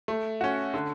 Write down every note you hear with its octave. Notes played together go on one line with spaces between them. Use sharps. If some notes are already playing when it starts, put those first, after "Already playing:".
A3
C#4 F#4
D3